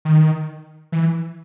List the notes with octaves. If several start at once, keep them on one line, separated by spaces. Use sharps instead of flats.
D#3
E3